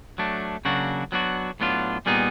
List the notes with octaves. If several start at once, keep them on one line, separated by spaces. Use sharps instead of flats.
F#3 A3 D4
C#3 F#3 A#3 D4 F#4
F#3 B3 D4 F#4
A2 F#3 B3 D4 F4
A#2 G3 B3 D#4 G#4